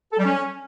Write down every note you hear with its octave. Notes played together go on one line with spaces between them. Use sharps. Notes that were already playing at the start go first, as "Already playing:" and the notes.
A4
G3
C#4